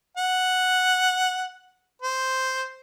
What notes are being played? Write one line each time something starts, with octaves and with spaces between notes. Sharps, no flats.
F#5
C5